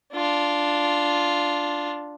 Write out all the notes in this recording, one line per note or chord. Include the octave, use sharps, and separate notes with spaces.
D4 F4